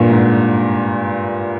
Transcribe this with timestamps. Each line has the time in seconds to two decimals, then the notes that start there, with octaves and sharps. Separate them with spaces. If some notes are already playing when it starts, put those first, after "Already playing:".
Already playing: G2 A#2
0.10 G#2